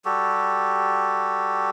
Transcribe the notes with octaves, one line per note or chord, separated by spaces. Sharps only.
G3 F#4 G4 A4